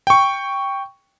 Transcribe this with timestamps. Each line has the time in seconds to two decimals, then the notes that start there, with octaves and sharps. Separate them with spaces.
0.07 G5 C#6